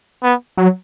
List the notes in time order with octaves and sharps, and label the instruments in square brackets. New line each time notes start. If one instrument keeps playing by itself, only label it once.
[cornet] B3
[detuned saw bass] F#3